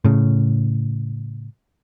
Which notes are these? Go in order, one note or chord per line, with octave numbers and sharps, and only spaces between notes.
A2 C#3